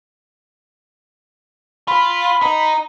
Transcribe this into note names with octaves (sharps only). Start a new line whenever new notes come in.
F4 B5
D#4